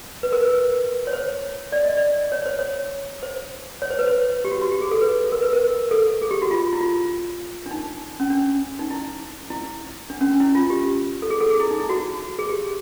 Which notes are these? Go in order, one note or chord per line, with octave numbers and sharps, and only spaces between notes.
B4
A#4
B4
B4
C#5
C5
D5
D#5
D5
C#5
C5
C#5
C5
C#5
C5
B4
C5
G4
F#4
F#4
G4
G#4
A4
B4
A#4
B4
A#4
A4
G#4
G4
F#4
F4
E4
F4
D4
D#4
C#4
D4
D#4
E4
E4
D4
C#4
D4
E4
F4
G4
A4
G#4
A4
G#4
E4
D#4
E4
F#4
G#4
G4